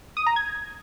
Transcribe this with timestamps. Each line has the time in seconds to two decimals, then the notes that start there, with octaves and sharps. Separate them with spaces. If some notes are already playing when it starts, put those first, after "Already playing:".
0.17 D#6
0.26 A#5
0.36 G#6